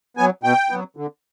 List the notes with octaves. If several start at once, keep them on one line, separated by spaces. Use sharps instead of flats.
F#3 B3 G#5
B2 G5
F#3 B3
D3